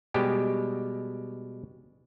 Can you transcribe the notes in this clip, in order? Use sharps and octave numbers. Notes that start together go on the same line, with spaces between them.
B2 G3 G#3 G4